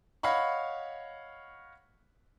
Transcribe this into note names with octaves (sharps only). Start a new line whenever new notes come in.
C#5 D#5 F5 F#5 B5 C#6